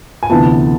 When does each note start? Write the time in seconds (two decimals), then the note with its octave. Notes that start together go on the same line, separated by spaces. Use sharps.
0.23 G#5
0.30 D2 C3 E3 B3 A5